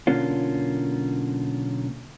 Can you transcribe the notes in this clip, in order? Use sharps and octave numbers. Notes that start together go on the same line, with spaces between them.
B1 D3 A#3 C#4 F4